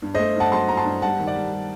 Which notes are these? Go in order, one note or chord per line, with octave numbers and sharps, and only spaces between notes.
G2
C5 D#5
A3
G2 F#5 A5
F#3 A5 C6
A3 A#5
A5 C6
G2
G3 F#5 A5
D#3
D5 F#5
G3
G3